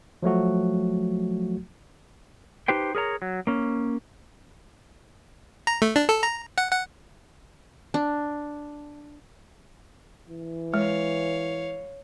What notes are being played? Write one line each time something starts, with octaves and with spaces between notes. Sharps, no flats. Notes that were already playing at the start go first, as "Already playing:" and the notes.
F3 F#3 A3 F#4
D#4 G4 B4 C5 G5
G#4 A#4 C#5 A#5
F#3
A#3 C#4
A#5
A3
D4
A4
A#5
F#5
F#5
D4
E3
G#3 C#5 F5